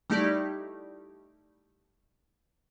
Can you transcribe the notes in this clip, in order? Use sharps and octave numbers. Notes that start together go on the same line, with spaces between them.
G3 A3 D#4 E4 G4 D5